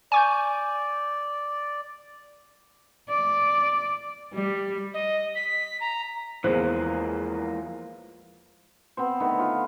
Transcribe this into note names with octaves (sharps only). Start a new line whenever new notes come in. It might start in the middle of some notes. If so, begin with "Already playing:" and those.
D5 G#5 C#6 G6
D5
G3
D#5
B6
A#5
E2 E3 F3 G#3 A#3 G#4 F#6
B3 C4 C5
D3 D#3 A3 B3
F4